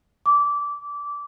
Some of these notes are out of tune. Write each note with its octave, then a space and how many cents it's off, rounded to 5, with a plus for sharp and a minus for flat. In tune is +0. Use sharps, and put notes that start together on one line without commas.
D6 -20